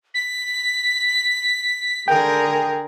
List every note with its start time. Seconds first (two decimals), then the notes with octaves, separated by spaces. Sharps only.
0.14 B6
2.08 D3 G#4 A#4 G5